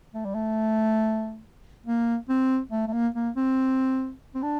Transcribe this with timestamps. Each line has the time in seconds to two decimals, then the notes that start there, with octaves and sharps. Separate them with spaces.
0.14 A3
0.25 G3
0.35 A3
1.86 A#3
2.29 C4
2.71 A3
2.88 A3
2.93 A#3
3.15 A#3
3.36 C4
4.35 C4
4.43 D4